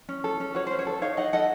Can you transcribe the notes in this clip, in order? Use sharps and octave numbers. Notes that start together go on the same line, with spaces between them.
C#4
A4
C#4
F#4 C#5
C5
C#4
C#5
A4
D#4 C#5 F5
D#4 D#5 F#5
A4 D#5 F#5